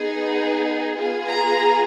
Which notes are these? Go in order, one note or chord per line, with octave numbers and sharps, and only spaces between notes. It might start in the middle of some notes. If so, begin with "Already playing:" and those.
Already playing: B3 D#4 G#4
B3 F4 G#4
A#5